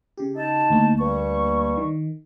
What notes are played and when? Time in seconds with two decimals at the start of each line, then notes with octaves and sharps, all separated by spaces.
0.17 C#3 G4
0.36 D#4 A5
0.70 D2 A#3
0.99 G2 G3 C#6
1.77 D#3